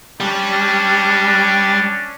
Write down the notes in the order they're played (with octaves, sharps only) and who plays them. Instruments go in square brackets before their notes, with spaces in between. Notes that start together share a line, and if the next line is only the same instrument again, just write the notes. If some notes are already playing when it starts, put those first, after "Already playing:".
[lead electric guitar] G3 [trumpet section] C#4 D4